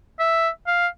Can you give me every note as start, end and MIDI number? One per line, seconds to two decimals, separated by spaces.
0.20 0.49 76
0.67 0.87 77